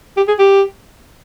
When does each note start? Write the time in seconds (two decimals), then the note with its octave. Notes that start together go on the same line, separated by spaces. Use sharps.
0.17 G4
0.28 G#4
0.39 G4